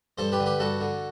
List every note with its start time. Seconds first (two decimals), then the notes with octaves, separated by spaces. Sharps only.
0.18 G2 A4 C5
0.32 G4 B4
0.40 D3
0.46 G4 B4
0.59 G2 F#4 A4
0.80 D3